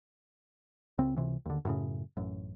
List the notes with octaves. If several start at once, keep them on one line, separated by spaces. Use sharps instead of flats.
C#2 C#3 C4
C#2 C3 E3
D#2 D3
F#2 A2 C#3
A1 F#2